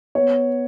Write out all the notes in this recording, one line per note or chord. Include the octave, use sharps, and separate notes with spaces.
B3 C#5